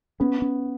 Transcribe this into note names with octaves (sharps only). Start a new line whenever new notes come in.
B3 C#4
C#4